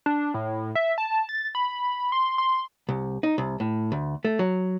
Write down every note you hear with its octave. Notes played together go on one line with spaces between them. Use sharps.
D4
A2
E5
A5
A6
B5
C6
C6
C2
D#4
C2
A2
D2
A3
F#3